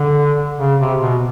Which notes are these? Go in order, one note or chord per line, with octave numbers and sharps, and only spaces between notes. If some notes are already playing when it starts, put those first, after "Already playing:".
Already playing: D3
C#3
C3
B2